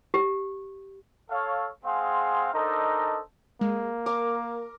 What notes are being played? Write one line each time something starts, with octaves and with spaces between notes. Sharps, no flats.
G4
A4 C#5 F5
G#3 C4 G#4 F5 F#5 C6
D4 D#4 A4 A#4 C5 D#5
G#3 A#3
A#4 D6